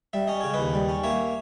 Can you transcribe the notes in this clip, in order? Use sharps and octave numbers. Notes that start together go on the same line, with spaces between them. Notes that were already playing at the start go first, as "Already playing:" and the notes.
G3 E5
C#4 D#5
C#3 C#5
D#2 B4 D#5
G3
C#4
A#3 C#5 E5